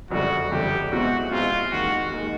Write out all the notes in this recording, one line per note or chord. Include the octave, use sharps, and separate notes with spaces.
F#1 F2 D3 G3 F#4
F#1 F2 D3 G3 G4
B1 B2 G#3 C4 E4 F#4
B1 B2 G#3 C4 E4 F4
D#2 D#3 G#3 F#4
D#2 D#3 G#3